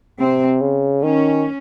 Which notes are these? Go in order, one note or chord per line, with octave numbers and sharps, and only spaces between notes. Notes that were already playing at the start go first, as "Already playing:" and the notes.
C3 C4
C#3
D#3 C#4